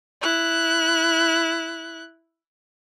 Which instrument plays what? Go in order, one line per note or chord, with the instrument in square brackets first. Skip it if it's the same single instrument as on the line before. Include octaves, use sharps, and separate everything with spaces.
[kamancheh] E4 F#6